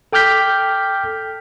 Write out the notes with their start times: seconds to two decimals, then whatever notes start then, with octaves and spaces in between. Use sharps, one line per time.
0.13 A4 G5 D6 F6 G6 B6